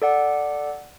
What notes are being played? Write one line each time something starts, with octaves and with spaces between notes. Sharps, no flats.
A4 D5 F#5